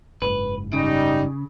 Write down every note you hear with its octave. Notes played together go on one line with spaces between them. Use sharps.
F#1 G#2 B4
C#3 G3 D#4